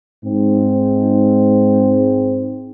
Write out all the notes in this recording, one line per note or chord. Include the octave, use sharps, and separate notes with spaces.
G#2 C4